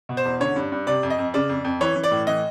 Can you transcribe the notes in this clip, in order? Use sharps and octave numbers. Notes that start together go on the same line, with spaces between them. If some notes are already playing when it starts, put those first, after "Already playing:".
B2
C5
E2
D3 C#5
G2
G2
C3 D5
F2
D#5
F2
C#3 D5
F2
F2
E3 C#5
E3
D5
A2
E3 D#5